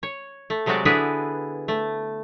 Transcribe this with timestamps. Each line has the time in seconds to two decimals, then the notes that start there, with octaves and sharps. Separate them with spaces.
0.03 C#5
0.50 A3
0.66 C3 F#3 G#3 C4 F#4 D5
0.85 D3 B3 D4 E4 G#4 B4
1.68 A3